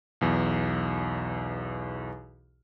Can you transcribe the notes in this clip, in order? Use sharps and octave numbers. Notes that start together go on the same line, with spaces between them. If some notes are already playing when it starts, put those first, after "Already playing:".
B1 E2